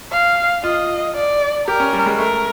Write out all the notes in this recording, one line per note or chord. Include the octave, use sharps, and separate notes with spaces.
F5
F4 D#5
D5
G4 A#4
C#4
G3
G#3
A3 A#4